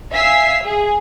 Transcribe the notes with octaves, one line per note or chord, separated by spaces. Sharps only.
E5 F5 G#5 E6 B6 C7
G#4